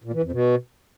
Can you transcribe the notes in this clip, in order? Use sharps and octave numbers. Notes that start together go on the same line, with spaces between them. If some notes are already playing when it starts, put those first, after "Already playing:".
A#2
E3
F2
B2